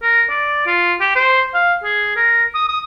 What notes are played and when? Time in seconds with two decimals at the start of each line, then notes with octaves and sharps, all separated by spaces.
0.02 A#4
0.29 D5
0.67 F4
1.00 G4
1.15 C5
1.54 F5
1.84 G#4
2.16 A#4
2.55 D#6
2.68 D#6